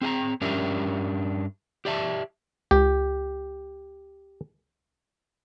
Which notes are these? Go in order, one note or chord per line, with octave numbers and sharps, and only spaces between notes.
C4 G#4 G#5 A#5
G2 C#4 D4 G4 A#4 E5
G4 D5 E5 A5
C#2 G4